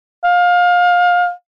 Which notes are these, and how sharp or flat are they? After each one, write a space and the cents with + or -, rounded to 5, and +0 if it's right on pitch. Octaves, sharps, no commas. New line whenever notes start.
F5 +25